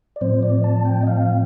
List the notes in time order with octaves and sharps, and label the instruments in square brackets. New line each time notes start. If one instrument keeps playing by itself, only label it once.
[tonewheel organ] D5
A2 F3 C4 C5
D5
A5
G5
D#5
F5